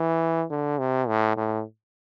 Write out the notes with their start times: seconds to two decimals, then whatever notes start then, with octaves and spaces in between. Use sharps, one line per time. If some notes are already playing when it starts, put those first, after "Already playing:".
Already playing: E3
0.50 D3
0.79 C3
1.08 A2
1.37 A2